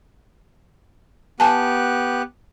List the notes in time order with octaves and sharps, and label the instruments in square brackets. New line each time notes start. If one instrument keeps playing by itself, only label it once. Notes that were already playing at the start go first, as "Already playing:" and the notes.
[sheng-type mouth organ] B3 G4 F#6 [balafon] G#5 A5